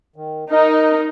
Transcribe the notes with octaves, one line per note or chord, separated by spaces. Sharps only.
D#3
D#4 A#4 D#5